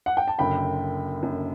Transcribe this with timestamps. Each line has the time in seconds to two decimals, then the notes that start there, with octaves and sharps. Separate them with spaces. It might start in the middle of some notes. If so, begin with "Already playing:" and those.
0.06 F#5
0.17 G5
0.28 A5
0.38 F#1 F#2 D3 G5 B5
1.22 F#1 F#2 D3